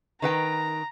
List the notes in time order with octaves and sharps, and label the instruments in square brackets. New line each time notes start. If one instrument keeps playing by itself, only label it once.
[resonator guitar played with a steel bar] D#3 B4 G5 [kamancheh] A#5